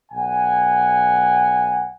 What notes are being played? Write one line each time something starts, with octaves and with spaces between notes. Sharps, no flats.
B1 F#5 G#5